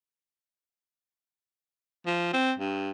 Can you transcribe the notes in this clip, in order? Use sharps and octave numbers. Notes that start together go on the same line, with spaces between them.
F3
C4
G2